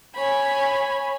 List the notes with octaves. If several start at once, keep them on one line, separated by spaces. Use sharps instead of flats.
C#5 G#5 B5